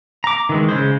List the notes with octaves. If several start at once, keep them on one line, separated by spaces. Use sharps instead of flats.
A#5 D6
D#3 E3 G#3
C#3 G#3 C5